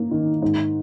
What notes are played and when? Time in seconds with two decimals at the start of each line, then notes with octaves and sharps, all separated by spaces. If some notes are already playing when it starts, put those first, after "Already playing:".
Already playing: A#3
0.11 D#3
0.42 G#2